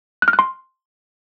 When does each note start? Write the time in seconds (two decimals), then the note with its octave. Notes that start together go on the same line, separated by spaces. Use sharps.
0.22 F#6
0.28 F6
0.33 F#6
0.39 C6